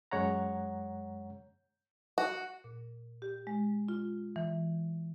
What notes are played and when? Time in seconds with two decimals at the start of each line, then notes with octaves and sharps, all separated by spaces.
0.11 F#2 G#3 C#5 F#5 A#5
2.18 F#4
2.64 A#2
3.22 G4
3.47 G#3
3.89 F4
4.36 E3